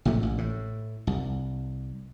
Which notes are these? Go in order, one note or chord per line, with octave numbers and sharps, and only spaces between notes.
A#1 A2 C3 A3
A1
A2
C2